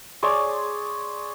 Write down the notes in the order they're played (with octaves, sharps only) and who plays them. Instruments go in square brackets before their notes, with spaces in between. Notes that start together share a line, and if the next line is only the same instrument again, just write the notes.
[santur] G#4 C#5 D5 C6